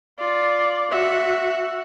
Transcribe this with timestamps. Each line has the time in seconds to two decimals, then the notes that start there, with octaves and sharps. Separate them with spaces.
0.19 F4 D5
0.91 F#4 E5